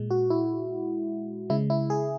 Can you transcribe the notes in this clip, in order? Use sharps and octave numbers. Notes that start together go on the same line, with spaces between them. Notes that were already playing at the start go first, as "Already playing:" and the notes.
Already playing: A#2 G#3
F#4
E4
C#3 G#3 E4
E4
G#4